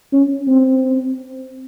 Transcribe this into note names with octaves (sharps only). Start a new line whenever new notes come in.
C#4
C4